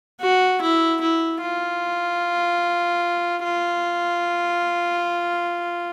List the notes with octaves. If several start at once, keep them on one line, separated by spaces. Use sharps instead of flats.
F#4
E4
E4
F4
F4